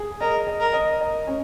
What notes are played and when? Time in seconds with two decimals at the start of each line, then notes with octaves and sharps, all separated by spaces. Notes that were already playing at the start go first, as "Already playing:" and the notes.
Already playing: G#4
0.21 A#4 D#5
0.47 D#5
0.60 A#4
0.73 D#5
1.01 D#5
1.27 C#4